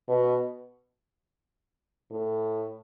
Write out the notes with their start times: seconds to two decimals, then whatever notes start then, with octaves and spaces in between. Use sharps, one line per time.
0.08 B2
2.11 A2